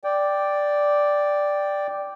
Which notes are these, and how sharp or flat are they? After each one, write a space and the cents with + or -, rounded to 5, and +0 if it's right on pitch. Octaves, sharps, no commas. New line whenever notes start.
D5 +0 G5 +0